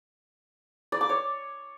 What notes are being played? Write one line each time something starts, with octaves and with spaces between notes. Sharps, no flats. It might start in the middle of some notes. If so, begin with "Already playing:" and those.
D5
D6
C#5